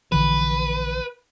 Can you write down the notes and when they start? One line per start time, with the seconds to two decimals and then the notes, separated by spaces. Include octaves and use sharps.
0.12 A#1 D3 E3 B4